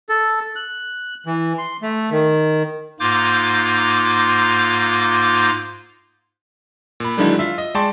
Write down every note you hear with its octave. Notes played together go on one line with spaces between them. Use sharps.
A4
F#6
E3
C6
A3
D#3
G#2 A#3 F4 D6 G6
A#2 B5
D3 D#3 F#3 G#3 D4 E4
F4 E5
D#5
G#3 D5 G5 A5 C6 C#6